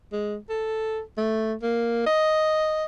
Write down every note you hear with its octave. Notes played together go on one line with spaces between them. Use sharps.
G#3
A4
A3
A#3
D#5